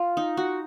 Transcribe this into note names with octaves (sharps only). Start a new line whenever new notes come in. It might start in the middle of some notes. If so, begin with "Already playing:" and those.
Already playing: F4
D#4
F#4